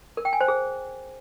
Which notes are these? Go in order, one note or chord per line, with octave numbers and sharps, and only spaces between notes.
A#4
G5
G#5
C5
G#4